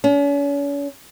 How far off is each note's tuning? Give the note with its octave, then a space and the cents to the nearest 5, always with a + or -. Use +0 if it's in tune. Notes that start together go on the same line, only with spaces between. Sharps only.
C#4 +40